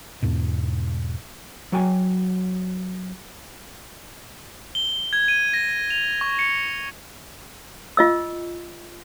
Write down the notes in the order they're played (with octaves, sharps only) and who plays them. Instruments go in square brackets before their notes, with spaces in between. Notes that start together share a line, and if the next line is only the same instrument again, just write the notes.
[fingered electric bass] E2 G#2 B2
[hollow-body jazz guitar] F#3 F#4 G5 G#5
[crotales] G7
G#6
D#7
A#6
F7
C#6
C#7
[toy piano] F4 D#5 E6